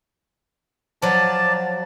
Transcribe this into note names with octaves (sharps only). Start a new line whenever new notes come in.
F3 F#3 D5 A5